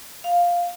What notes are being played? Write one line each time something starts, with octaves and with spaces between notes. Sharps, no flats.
F5